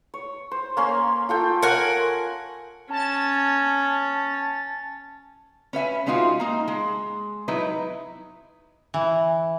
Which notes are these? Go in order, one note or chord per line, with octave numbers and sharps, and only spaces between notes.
C#5
C5
A#3 C#4 C6
F4 A4 G5
A#4 F#5 G#5
C#4 A5 A6
C#4 B4 E5 G#5
G#3 C#4 D#4 F4 F#4
A#3 D#4
G#3
F#3 D#4 E4 B4
E3